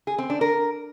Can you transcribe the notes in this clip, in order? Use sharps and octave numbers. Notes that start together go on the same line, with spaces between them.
G#4
C4
D4
A#4